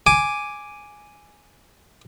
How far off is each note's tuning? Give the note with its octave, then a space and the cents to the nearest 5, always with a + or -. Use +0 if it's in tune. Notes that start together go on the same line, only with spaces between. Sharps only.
G#5 +0 D6 +0